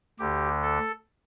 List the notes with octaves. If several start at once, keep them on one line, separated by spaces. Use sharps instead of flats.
D2 D3 G4
A4